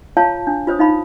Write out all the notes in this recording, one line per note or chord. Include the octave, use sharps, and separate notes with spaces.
F4 C#5 F5 A5 A#5
D4
F4 C5 C#5 D#6
D#4 F5 B5